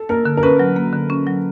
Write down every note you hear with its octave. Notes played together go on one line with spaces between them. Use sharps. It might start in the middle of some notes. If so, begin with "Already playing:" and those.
Already playing: A4
A#3 A#4
D3
A#4
C#4 B4
F#3
A#3
D3
C#4
F#3